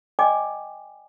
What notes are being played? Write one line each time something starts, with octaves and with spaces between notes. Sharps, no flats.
D5 D#5 G5 G#5 D6